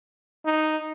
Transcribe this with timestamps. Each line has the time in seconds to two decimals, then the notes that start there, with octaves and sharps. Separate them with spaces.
0.46 D#4